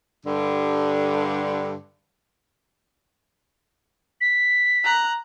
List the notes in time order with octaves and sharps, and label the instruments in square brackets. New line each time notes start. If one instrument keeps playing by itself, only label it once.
[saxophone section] G2 D3
[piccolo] B6
[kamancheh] A#5 F#6